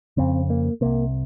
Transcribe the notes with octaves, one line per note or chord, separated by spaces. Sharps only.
F2 C#3 C4
A#3
C2 C3 A#3